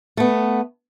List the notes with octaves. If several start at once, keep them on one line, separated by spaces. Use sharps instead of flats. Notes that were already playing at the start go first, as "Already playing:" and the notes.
A3 B3